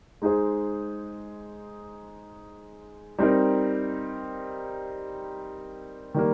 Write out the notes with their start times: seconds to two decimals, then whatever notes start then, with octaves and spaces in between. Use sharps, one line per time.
0.22 G#3 D#4 G#4 C5
3.18 G3 C4 D#4 A#4
6.15 D#3 G3 A#3